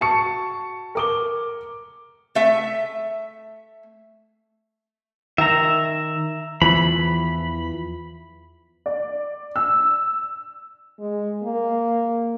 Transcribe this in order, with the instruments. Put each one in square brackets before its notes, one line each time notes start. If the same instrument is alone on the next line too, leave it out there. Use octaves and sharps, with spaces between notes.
[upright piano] F#4 A5 C#6 C#7
A#4 D6 G7
[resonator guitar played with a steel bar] A3 E5
[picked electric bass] D#3 [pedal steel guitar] E5 A#5
[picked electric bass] E2 E3 F3 [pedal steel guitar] B5
[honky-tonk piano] D5
E6
[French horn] G#3
A#3